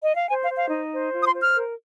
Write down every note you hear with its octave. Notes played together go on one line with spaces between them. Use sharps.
D#5
F5
C5 G#5
F5
C5
F5
D#4
C5
F4
D#6
C6
C5
F6
A#4